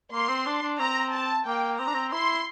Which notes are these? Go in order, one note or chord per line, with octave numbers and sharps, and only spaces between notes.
A#3 C6
C4
D4
D4
C4 A#5
A5
A#3 G5
C4 A#5
D4
C4
E4 C6